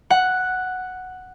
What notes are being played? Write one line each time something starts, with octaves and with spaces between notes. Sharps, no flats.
F#5